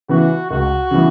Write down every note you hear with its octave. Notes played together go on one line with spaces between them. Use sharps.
C#3 E3 B3 F#4
C#2 F#4
C#3 E3 B3